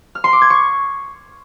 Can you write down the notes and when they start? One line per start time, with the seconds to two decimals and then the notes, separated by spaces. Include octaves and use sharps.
0.15 F6
0.24 C6
0.33 D6
0.41 G#6
0.50 C#6